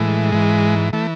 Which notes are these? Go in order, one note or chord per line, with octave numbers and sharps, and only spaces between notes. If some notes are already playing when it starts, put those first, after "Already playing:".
Already playing: A2 E3 G#3
G#2 E3
E3 A3